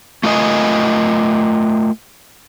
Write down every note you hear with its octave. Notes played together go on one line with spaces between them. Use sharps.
A3 F4 A#4 D#5 G#5